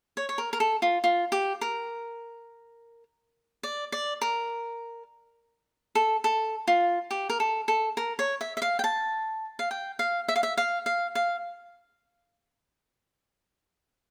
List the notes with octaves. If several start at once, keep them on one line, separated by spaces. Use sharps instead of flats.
C#5
C#5
A#4
A#4
A4
F4
F4
G4
A#4
D5
D5
A#4
A4
A4
F4
G4
A#4
A4
A4
A#4
C#5
E5
E5
F5
G5
A5
F5
G5
F5
E5
F5
E5
F5
F5
F5